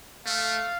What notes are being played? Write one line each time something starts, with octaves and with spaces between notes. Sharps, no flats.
A3 F5